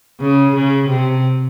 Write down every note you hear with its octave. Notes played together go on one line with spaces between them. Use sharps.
C#3
C#3
C3